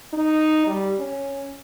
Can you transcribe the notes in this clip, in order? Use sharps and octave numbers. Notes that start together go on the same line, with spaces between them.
D#4
G3
C#4